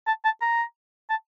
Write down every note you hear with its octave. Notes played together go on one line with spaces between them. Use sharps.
A5
A5
A#5
A5